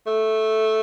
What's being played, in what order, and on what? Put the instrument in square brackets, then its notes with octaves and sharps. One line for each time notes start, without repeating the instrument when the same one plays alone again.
[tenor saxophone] A3